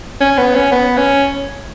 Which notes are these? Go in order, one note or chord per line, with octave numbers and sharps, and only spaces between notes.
C#4
B3
C#4
B3
C#4